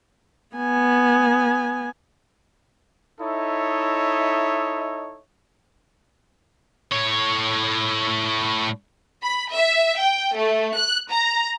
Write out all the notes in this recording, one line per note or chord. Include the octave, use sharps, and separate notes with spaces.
B3 G#5
D#4 E4 A4 C#5 D#5 E5
A2 C#5
B5
E5
G5
A3
F#6
A#5